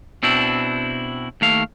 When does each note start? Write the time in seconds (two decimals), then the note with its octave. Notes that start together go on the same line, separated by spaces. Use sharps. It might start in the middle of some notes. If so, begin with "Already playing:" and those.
0.23 B2 C4 D4 E4
1.41 D#2 A3 F5